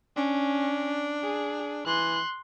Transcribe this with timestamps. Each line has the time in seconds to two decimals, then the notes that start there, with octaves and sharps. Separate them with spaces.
0.17 C#4 D4
1.24 G#4
1.86 E3 C6 F#6